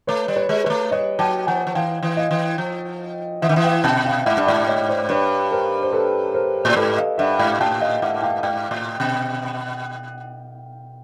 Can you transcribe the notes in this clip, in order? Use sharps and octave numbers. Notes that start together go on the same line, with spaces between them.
A3 B4 C#5
G3
B4 C#5
G#3
G#3 B4 C#5
A3
G3 C#5 D#5
F#3 G5 A5
F3 F#5 G#5
F3
E3 F5 G5
E3
D#5 F5
E3
F3
E3 E5 F#5
D#3
E3
F5 G5
B2 G5 A5
F5 G5
G#2 E5 F#5
G2
G#2 D5 E5
C#5 D#5
C5 D5
G2 B4 C#5
A#4 C5
C5
A4 B4
A#4 C5
A2
G#2 A4 B4
D#5 F5
G2 E5 F#5
G#2 F5 G5
A2 G5 A5
D#5 F5
G#2 E5 F#5
F5 G5
G#2 F5 G5
A2
B2